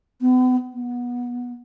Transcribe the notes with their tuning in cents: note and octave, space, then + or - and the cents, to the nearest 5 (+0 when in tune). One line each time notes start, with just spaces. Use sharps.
B3 +40
B3 -20